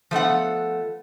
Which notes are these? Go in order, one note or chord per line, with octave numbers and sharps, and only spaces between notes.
F3 A3 B3 F#5